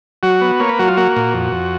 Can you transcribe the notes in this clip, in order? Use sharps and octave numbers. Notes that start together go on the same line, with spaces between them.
F#3 F#4
B3
A#3 C#5
B4
F#3 F#4
F4
A#3 F#4
A#2
F2
F2